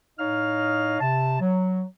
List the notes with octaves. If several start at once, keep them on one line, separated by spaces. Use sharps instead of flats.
A2 D#4 C#5 D#5 F5 F6
C3 A5
F#3